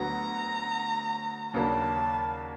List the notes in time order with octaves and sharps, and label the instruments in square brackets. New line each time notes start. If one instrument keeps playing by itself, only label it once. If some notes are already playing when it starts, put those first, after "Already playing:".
Already playing: [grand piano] D2 D3 F#3 B3 [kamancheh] A#5
[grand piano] D#2 C#3 F#3 A#3 D4 [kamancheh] A5